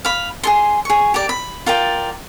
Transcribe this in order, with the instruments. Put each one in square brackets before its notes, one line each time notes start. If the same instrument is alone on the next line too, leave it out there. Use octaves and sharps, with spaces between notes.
[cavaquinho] F5 B5
G#4 A4 C6
G#4 C#6
G4 A#4 D5
B5
F4 A#4 D5 G5